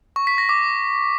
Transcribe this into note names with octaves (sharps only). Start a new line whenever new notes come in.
C#6
B6
A#6
D6